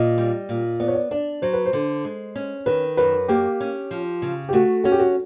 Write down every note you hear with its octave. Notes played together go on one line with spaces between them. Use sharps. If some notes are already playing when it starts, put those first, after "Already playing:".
Already playing: A#2 D#5
G3
A#2
B3 D5
C#5
D5
D4 D5
F#3 C5
B4
C5
D3
G#3
C#4
D#3 B4
F#2 B4
A#3 G4
C#4
F3
C#3
G4
A3 F#4
C#4 F#4
G4
F#4